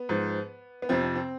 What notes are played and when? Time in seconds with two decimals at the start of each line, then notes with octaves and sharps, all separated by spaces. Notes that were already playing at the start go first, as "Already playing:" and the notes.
Already playing: B3
0.09 G#2 F3
0.82 B3
0.89 F2 C3 F3 C4
1.03 C4
1.16 C4